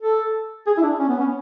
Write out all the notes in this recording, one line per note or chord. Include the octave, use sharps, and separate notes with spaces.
A4
G#4
E4
D4
C#4
B3
C#4